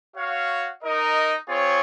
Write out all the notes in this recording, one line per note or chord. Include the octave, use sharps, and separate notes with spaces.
F#4 C#5 F5
D#4 A#4 D#5
C4 F4 G#4 C#5